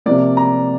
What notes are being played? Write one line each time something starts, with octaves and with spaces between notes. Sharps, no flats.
C3 F3 A#3 D5
A#5